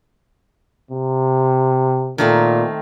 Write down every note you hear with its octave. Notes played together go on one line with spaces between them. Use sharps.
C3
A#2 D#3 A3 C4